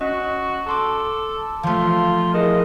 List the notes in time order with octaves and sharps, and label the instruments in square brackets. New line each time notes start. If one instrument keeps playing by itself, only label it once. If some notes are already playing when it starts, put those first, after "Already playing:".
[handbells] C#4 D#5 [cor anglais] F#4
[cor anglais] A4 [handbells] A5 C6 D6
[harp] F3 A3 [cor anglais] F4
[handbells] E4 G#4 A#4 [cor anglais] D#5